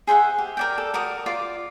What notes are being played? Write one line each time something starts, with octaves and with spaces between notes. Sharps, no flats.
G#4 C5 E5 F#5
G4
A#4 D5 G5
A4
F#4 A#4 D5 D#6
F4 D5